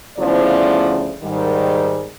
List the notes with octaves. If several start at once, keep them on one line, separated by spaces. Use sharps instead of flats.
D2 C#3 F3 B3 E4 D5
G#2 D#3 G3